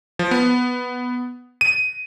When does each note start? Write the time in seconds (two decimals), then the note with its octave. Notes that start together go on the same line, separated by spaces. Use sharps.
0.19 F3
0.31 B3
1.61 D#7